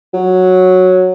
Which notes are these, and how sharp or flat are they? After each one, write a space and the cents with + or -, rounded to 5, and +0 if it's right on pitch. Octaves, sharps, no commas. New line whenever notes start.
F#3 -5